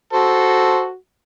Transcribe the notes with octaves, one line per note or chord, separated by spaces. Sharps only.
F#4 A4 C5